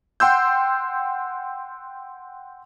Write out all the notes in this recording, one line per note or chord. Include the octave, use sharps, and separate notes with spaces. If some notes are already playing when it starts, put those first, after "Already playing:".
F#5 G5 C6 E6 G6